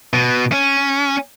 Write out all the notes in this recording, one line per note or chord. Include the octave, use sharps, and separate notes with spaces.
B2
C#4